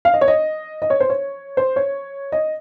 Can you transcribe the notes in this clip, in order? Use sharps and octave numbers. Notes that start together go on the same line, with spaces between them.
F5
D#5
C#5
D#5
D#5
C#5
C5
C#5
C5
C#5
D#5